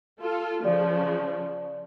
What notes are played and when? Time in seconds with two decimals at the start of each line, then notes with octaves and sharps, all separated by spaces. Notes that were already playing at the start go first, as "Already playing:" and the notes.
0.21 F4 A4
0.64 C#3 F3 D5